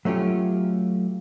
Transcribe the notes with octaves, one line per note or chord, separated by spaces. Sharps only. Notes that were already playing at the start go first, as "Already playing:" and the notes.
F#3 A3 C#4 F4 G4